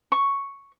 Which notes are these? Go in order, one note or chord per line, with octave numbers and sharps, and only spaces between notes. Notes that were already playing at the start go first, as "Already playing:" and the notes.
C#6